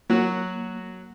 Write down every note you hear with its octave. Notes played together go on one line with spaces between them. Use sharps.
F#3 A#3 F#4